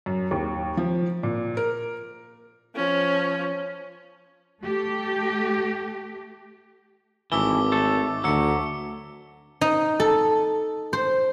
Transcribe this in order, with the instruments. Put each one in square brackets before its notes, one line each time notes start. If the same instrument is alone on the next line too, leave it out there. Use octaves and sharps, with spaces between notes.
[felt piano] F#2
D#2
F3
A#2
A#4
[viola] F3 C#4
[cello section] A3 G4
[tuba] G#1 [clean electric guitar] E3 A3 [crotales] D6 E6 G7
[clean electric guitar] A3 A4
[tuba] D2 [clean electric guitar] F#3 A3 [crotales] E6 C#7
[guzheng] D#4
A4
C5